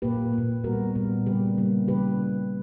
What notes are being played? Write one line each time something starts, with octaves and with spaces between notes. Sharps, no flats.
A#2 A#3 G4 B4
A#2 A#3
A#2 G3 B3 F#4 A#4
A#2 G3 B3
C#3 G3 A#3 G4 B4
C#3 G3 A#3
C#3 E3 G3 A#3 G4 B4